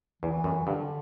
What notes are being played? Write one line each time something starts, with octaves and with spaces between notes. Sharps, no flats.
E2 E3
F#2
G2 D3